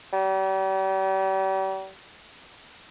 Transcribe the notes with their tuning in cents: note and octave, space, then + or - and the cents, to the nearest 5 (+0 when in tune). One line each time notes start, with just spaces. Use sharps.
G3 -40